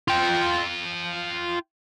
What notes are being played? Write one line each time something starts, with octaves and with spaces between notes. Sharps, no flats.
F4 G5